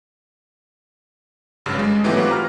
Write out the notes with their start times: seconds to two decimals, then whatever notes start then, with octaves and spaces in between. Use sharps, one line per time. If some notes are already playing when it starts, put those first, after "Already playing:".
1.66 G#1 G2 C#3 F#3
1.79 G#3
2.04 G#2 E3 F#3 A3 B3 G4
2.16 E3 C4 F4 F#4 B4 D6
2.31 A#5 F6